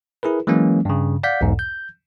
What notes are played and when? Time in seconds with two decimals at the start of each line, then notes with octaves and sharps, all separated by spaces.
0.23 E4 G#4 A#4 B4
0.47 E3 F#3 G#3 A#3 C#4
0.85 G2 C#3
1.23 D5 F5 F#5 G6 B6
1.41 B1 E2 G#2
1.59 G6